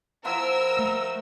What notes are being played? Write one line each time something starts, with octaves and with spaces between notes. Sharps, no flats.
F3 E4 A#4 F#5 E6
A3